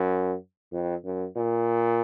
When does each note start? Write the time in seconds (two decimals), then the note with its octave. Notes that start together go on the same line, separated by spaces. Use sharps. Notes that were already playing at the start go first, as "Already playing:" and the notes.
Already playing: F#2
0.73 F2
1.05 F#2
1.36 A#2